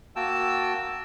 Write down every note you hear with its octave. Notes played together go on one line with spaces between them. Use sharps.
A#3 F#4 G5 A5 E6